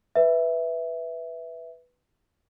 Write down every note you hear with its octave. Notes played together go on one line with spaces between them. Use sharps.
B4 E5